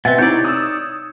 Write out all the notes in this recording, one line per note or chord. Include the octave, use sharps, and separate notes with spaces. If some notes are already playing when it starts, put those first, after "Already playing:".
B2 C4 B4 E5 F#5 G#5 A6
C3 D#4 E4 C#5 D5 G6
D#6 E6